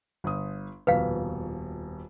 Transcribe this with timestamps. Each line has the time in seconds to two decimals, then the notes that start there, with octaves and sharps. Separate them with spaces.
0.24 G1 D#6
0.87 D#1 F2 B2 B4 F5